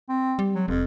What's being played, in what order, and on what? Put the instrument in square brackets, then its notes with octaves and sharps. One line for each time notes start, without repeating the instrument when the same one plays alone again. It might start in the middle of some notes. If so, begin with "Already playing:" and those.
[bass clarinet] C4
[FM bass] G3
[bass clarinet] F#3
[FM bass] F1 [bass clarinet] F2